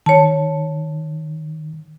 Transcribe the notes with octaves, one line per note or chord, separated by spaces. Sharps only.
D#3 C#5 A5